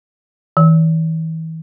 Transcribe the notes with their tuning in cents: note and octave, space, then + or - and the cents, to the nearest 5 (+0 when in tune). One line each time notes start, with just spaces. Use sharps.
E3 -40